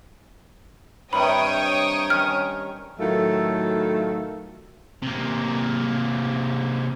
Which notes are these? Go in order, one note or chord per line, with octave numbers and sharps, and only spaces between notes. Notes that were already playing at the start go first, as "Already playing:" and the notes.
G2 C3 D#3 C#5 G5 B5 D#6
D#3 C#4 F6
A2 D#3 F#3 A3 F4 A4
C3 A#3